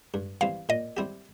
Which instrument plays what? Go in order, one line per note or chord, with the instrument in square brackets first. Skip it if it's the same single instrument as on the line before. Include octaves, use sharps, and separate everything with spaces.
[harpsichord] G2
[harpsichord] E3 G3 C4 [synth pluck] F5
[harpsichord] A#2 [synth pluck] D#5
[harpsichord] G3 C4 E4 G4